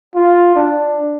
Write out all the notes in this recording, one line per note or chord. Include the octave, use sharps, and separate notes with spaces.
F4
D4